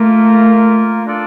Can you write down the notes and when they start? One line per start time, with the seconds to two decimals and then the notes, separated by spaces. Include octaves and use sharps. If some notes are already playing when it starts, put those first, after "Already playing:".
Already playing: A3 A#3 F4 A#4
1.06 D4 F4 A4 D5